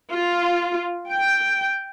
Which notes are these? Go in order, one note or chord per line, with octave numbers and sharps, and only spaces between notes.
F4
G5